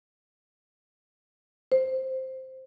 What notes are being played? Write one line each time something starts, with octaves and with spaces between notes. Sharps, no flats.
C5